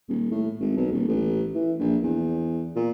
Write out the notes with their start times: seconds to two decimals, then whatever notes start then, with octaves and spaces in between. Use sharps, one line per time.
0.09 D#1
0.31 A2
0.60 G#1
0.76 B1
0.92 D#1
1.08 A1
1.55 E3
1.79 A#1
2.03 E2
2.76 A#2